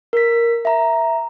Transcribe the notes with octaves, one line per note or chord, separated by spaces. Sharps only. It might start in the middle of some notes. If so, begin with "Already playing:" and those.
A#4 B6
E5 A#5